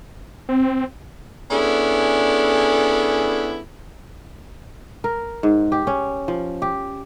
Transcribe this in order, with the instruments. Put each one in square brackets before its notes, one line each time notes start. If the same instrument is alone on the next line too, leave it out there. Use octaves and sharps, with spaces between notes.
[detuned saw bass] C4
[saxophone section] B3 C#4 D4 E4 G#4 A4
[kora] A#4
G#2
G4
C#4
F3
G4